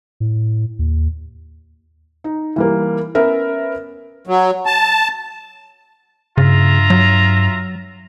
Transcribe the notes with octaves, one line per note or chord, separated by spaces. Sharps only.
A2
D#2
D#4
E3 G3 A#3
B3 C#4 A#4 B4 E5
F#3
A5
G2 C#3 F4 E5 A#5
F#3